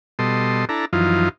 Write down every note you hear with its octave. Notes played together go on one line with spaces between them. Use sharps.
B2 G3 A4 D#5 C6
D4 E4 A4 A#5
F#2 E3 F3 D#4 F4